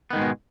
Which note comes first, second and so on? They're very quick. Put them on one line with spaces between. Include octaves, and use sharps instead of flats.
B3 D#3 G#2 G#3 B2